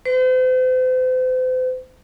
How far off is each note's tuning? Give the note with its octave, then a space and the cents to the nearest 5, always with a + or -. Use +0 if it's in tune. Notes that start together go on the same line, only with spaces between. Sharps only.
C5 -40